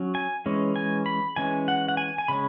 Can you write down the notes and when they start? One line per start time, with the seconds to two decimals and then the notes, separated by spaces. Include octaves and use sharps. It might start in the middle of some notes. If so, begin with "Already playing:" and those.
Already playing: F#3 C#4
0.15 G#5
0.46 E3 G#3 C#4
0.76 G#5
1.06 B5
1.36 E3 G#3 C#4 G#5
1.68 F#5
1.88 F#5
1.97 G#5
2.18 G#5
2.28 C#3 G#3 C#4 B5